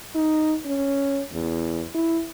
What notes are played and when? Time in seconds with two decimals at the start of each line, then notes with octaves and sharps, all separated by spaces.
0.15 D#4
0.66 C#4
1.32 E2
1.95 E4